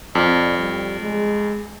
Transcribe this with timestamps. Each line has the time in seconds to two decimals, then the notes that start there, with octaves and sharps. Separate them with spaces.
0.15 F2 D5
0.59 G3
1.01 G#3